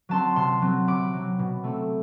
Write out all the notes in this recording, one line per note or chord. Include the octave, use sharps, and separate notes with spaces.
F#3 C4 A5 C6
C3 A5 C6
F#3 C4
C3 B5 D6
F#3 C4
B2
A3 C4